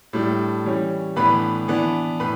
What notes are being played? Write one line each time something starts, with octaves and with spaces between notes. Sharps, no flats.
A2 G3 D4
E3 G3 C#4
A2 E3 B3 D4 B4 B5
E3 B3 D4
A2 B4 B5